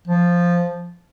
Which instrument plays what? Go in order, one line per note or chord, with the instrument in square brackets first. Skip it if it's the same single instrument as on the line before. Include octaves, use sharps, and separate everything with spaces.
[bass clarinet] F3